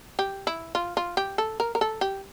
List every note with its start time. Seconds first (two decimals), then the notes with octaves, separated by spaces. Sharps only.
0.19 G4
0.47 E4
0.75 F4
0.97 F4
1.17 G4
1.38 A4
1.60 A#4
1.75 A#4
1.81 A4
2.01 G4